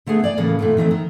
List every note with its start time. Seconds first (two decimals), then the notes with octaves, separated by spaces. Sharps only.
0.07 D3 A3 B3 G#4
0.24 D5 G#5
0.38 A2 C#3 E3 A#3
0.59 A#2 D#3 A3
0.77 D#3 E3 A3 C4
0.91 D#3